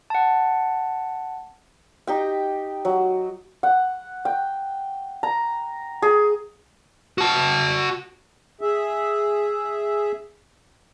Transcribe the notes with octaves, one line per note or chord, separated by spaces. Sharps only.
F#5 A5
D#4 G4 G5
F#3
F#5
G5
A#5
G#4
F#4 A5
G#4 E5